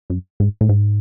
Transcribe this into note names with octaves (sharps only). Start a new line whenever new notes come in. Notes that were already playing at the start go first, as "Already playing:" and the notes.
F#2
G#2
A2
G#2